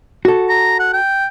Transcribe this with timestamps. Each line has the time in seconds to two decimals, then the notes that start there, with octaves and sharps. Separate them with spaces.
0.25 F#4 A4
0.49 A#5
0.79 F#5
0.93 G5